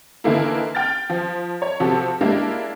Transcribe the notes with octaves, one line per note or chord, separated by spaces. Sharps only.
D3 E3 A3 A#3 D#4 E4
G5 F6 A6
F3
C#5
C3 F3 F#4 G4 A4
G#3 A#3 D4 E4 G4